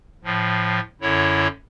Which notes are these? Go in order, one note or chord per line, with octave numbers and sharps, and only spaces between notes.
A2 F3
F#2 D3 E4 C#5